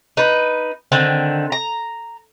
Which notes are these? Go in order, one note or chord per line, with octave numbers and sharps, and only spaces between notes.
D#4 B4
D3 D#3 C4
A#5